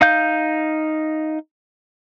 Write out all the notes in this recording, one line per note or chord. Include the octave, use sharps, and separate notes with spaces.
D#4 F5 G6